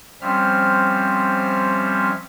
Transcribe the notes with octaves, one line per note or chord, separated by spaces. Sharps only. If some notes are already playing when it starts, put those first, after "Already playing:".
F3 G3 C4 C#4 E5 F6